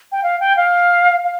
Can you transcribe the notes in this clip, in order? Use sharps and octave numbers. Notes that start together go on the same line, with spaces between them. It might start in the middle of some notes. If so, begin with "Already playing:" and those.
G5
F5
G5
F5
F5